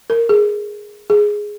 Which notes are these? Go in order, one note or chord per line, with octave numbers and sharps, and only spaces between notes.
A#4
G#4
G#4